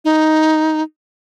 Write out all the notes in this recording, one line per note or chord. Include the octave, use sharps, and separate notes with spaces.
D#4